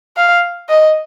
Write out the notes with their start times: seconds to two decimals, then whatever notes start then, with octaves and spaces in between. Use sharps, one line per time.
0.17 F5
0.69 D#5